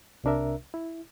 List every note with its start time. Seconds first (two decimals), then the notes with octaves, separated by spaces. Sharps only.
0.24 C2 C3 D4 A#4 E5
0.74 E4